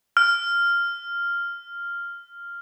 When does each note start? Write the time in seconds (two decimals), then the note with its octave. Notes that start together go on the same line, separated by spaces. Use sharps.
0.17 F6